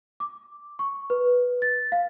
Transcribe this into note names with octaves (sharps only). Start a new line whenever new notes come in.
D6
C#6
B4
A6
F5